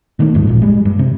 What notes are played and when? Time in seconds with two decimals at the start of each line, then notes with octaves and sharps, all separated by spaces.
0.19 B2 D#3 A3 A#3
0.34 D#2 G#2 F3 G#3
0.47 G#1 A#2
0.62 G3 G#3
0.85 G2
0.99 C3